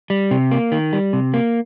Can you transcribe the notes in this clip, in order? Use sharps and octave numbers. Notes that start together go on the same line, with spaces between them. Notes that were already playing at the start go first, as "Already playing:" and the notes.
G3
C3
A#3
D#3
G3
C3
A#3